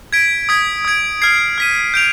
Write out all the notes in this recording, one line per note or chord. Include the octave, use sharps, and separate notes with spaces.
G#6 B6 D7
D#6 G#6 B6 D7
D#6 G#6 D7
F6 G#6 C7
F6 B6 D#7
G6 D7 F7